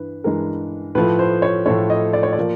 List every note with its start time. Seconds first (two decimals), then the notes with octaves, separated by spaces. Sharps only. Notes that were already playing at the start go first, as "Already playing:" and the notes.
Already playing: G2 E3 B4
0.24 G2 E3 G#3 A#4
0.95 A2 F3 A3 B4
1.19 C5
1.42 C#5
1.66 A2 F3 A3 C#5
1.90 D#5
2.13 D5
2.23 C#5
2.33 D5
2.39 F3 A#3